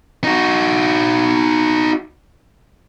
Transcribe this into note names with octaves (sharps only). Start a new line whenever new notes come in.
D#4 F#4